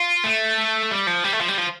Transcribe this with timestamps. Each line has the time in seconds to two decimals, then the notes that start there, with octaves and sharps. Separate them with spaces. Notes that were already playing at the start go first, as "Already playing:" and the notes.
Already playing: F4
0.24 A3
0.91 G3
1.07 F3
1.24 G3
1.33 A3
1.41 F3
1.48 G3
1.58 F3